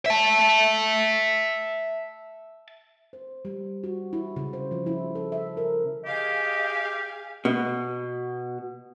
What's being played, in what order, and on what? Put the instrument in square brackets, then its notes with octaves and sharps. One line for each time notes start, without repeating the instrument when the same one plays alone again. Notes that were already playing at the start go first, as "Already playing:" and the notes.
[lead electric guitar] E5 A5
[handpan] C5
G3
F#4
E4
C#3
C5
F3
E4
A4
E5
A#4
[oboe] G4 [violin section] G#4 F5 [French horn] D#5
[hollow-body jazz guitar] B2